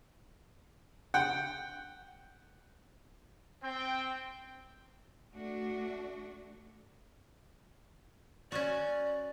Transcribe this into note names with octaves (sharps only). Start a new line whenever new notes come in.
F#5 G5
C4 G5
A3 D4 F#4
C#4 F#4 D5